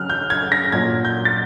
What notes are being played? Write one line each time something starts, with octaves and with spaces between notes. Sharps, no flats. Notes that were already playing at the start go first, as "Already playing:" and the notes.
Already playing: C#3 F#3 F6 F#6
G6
G#6
A#6
A#2 F#3 G#6
G6
A6